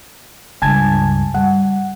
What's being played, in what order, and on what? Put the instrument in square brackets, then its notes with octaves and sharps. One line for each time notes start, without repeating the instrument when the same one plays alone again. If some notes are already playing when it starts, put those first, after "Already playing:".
[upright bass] C#2 G2 [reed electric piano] G#5 A5 G#6
[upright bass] G3 [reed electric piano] F#5